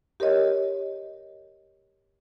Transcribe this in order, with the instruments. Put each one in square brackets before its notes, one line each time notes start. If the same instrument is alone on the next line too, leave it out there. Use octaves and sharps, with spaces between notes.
[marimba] G4 A#4 C#5 D#5